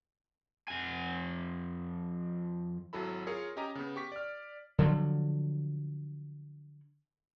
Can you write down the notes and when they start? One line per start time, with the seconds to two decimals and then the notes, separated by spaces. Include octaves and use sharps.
0.68 F2 G#5
2.93 G#1 F#3 E4 A4 B5
3.27 F4 G#4 A#4 C#5
3.56 C#4 G4 D#5 G#5 A#5
3.75 C#3 B3
3.96 G4 C#6 B6
4.12 D5 F6
4.78 D3 F3 F#3